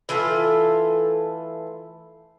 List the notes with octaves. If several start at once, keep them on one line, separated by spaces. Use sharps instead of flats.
E3 A3 F4 A4